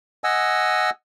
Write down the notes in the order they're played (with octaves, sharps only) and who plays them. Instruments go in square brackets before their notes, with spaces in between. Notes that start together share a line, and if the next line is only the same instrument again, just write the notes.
[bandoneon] D#5 F#5 G#5 E6